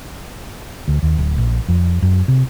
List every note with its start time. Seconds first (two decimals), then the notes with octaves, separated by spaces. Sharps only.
0.88 D2
1.03 D#2
1.18 D1
1.38 A#1
1.68 F2
2.02 F#2
2.28 C3